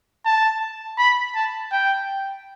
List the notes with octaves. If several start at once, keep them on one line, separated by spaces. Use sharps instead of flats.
A5
B5
A5
G5